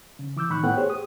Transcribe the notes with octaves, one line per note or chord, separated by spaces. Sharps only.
C#3
E3 D6 E6 G6
A2 D#3 B5 C#6 F#6
A2 A3 B3 F#5 G5 F#6
G4 G#4 C5 C#5
D#6